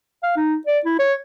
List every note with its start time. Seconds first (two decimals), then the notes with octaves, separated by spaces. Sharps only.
0.23 F5
0.37 D#4
0.67 D5
0.85 E4
0.99 C#5